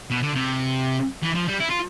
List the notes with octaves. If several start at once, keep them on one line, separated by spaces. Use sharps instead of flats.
B2
D3
C3
E3
F3
G3
E4
F4